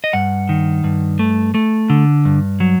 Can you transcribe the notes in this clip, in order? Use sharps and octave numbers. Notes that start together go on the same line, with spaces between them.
D#5
G2 F#5
D#3
G2
A3
A3
D3
G2
F#3